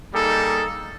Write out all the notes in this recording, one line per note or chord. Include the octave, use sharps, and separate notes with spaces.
G3 A#3 D#4 G#4 A4